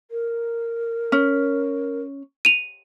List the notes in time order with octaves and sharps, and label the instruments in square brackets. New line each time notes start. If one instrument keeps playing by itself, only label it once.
[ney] A#4
[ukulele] C#4
[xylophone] D#7 F7